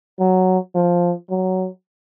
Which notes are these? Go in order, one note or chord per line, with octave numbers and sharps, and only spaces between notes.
F#3
F3
F#3